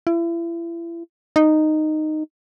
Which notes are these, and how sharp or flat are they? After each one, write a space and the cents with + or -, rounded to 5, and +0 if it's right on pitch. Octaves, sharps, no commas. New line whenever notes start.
E4 +35
D#4 -10